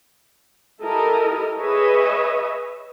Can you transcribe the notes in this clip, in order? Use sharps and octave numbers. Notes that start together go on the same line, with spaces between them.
E4 G4 A4 A#4 D#5
G#4 B4 C#5 D#5 E5